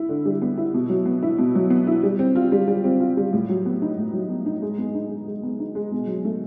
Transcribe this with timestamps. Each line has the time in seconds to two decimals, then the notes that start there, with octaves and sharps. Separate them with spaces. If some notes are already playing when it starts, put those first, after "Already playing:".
Already playing: E4
0.09 D3
0.25 G3
0.42 B3
0.57 E4
0.74 B2
0.89 F#3
1.06 B3
1.23 E4
1.38 B2
1.55 F#3
1.70 B3
1.87 E4
2.03 G3
2.19 C4
2.36 F4
2.52 G3
2.68 G3
2.84 C4
3.00 F4
3.17 G3
3.33 A2
3.50 F#3
3.66 B3
3.82 D#4
3.97 A2
4.13 F#3
4.30 B3
4.46 D#4
4.62 G#3
4.78 B3
4.95 D#4
5.11 G#3
5.27 G#3
5.43 B3
5.60 D#4
5.75 G#3
5.92 B2
6.07 F#3
6.25 A3